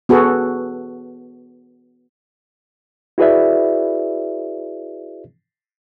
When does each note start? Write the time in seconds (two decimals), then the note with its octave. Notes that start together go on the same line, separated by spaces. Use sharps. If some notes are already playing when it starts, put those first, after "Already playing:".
0.09 B3 F#4 G#4 A4
3.18 E4 F#4 G#4 B4 D5 E5